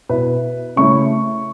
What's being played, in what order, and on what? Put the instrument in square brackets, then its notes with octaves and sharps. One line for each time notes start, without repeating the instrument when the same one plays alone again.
[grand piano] B2 B3 E4 B4
C#3 A3 E4 C#6